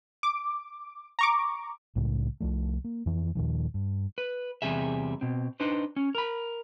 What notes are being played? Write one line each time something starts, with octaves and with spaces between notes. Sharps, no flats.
D6
A#5 C#6 D6
C2 A2 C#3 G#3
C2 F2 F3 A3
A#3
F2 E3
D#2 A#2 D#3 F3
G2
B4
E2 C3 G3 G#4 E5
B2 C4
D4 D#4 B4 C5
C#4
A#4 B5